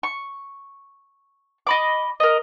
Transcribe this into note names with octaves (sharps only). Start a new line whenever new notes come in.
C#6
D#5 B5 D6
A#4 D#5